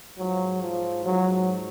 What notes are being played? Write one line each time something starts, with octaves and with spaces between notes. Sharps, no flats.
G#2 F3 F#3
F3
G#2 F3 F#3